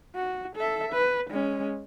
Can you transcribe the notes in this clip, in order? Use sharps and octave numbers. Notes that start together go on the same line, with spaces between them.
F#4
A4 E5
B4
G#3 C#4